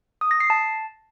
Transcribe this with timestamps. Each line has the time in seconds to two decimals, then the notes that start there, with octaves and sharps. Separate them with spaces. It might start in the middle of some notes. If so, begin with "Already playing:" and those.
0.21 D#6
0.31 A#6
0.40 C7
0.50 A5